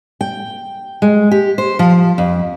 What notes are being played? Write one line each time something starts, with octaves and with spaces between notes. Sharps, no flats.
G5
G#3
G4
C5
F3
F2